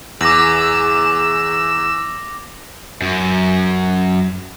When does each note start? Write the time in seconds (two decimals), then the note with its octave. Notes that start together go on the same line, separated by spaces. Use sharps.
0.21 E2 G#4 D6 E6 A#6 F#7
3.02 F#2